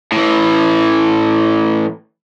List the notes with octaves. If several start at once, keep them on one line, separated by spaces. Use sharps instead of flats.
A2 E3